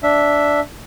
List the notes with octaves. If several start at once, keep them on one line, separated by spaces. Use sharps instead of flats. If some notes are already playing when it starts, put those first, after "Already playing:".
D4 E5